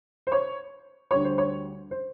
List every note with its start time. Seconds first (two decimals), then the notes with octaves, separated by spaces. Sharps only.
0.27 C5
0.32 C#5
1.11 D2 D3 G3 C#5
1.24 C5
1.38 C#5
1.91 C5